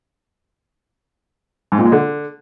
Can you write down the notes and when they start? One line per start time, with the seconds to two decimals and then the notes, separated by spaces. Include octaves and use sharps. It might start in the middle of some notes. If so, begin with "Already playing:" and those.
1.72 G#2
1.79 A#2
1.85 G#3
1.92 D3